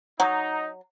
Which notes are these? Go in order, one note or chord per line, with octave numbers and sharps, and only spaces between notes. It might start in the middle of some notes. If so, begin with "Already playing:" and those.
F#3 D#4 F#5 A#5